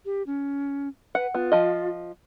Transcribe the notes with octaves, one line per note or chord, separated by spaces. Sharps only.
G4
C#4
B4 F#5
B3 F4
F3 D#5